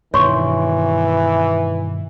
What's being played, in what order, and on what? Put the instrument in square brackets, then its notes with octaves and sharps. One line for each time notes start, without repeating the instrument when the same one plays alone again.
[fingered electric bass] G2 B2 D#3 [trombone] E3 [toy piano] C#5 C6 C#6